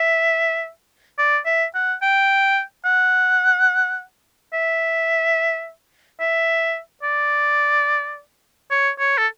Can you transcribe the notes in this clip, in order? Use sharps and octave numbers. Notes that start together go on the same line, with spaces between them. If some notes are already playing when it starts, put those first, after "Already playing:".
Already playing: E5
D5
E5
F#5
G5
F#5
E5
E5
D5
C#5
C#5
A4